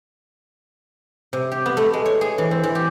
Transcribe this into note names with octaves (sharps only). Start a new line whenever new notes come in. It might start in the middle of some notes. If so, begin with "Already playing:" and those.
C3
G4
B3
A3
G#3
C#5
G#4
E3
C4
E3
G4